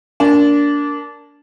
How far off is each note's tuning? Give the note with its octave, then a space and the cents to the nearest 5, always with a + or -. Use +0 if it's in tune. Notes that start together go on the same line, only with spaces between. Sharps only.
A#3 +0 D4 -20